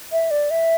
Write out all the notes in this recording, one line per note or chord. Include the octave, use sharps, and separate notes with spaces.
E5
D5
E5